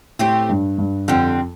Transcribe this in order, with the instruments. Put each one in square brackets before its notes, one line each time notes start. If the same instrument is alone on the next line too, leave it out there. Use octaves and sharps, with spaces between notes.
[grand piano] A2 [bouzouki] A3 C4 G4
[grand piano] G2
G2
[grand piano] F2 [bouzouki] D3 G3 C4